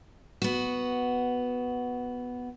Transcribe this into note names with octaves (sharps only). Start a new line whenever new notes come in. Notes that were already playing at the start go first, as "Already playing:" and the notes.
B3 F#4